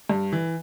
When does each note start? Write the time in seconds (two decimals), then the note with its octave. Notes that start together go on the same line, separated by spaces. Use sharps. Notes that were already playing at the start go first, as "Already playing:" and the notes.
0.10 G2
0.32 E3